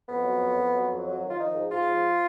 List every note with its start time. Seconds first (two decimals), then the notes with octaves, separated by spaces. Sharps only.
0.08 F2 B3
0.24 F#3
0.41 F2
0.57 F2
0.74 F#3
0.90 F2
1.06 F#3
1.22 D#3
1.29 F4
1.39 F3 D#4
1.55 G#2
1.70 G#2 F4
1.87 F3